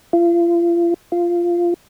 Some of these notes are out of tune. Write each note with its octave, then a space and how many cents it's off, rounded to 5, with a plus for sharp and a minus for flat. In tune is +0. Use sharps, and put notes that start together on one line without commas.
F4 -35
F4 -10